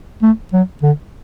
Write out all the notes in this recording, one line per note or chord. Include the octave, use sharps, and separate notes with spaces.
A3
F#3
D3